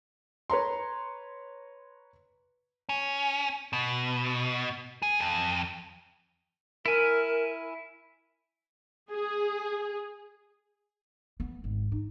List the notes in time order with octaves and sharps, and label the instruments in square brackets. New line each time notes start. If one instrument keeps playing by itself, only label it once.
[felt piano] B4 C#5 A#5 C6
[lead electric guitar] C#4
B2
G#4
F2
[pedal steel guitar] E4 G#5 [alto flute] A#4
[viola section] G#4
[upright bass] B3
G#1
D#4